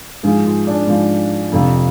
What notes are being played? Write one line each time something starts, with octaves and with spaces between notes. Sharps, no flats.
G#2 F3 G#4
F4
D4
G#2 F3
F2 C3 F3